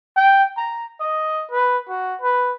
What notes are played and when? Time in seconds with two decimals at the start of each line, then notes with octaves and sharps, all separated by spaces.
0.16 G5
0.57 A#5
1.00 D#5
1.51 B4
1.88 F#4
2.21 B4